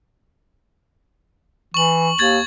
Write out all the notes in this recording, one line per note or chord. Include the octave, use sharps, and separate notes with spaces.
E3 C#6 F#7
D#2 G#6 A6 F#7